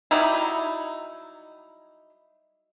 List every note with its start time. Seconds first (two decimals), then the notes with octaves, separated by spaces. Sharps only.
0.11 F#3 G3 D#4 E4